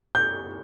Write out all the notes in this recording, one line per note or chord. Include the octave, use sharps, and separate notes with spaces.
G6